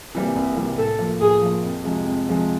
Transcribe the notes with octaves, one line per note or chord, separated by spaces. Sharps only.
C3 E3 G3 A#3
C2
C3 E3 G3 A#3
A2 A4
F3 A#3
A2 G#4
F3 A#3
F2
C3 F3 G#3
F2
C3 F3 G#3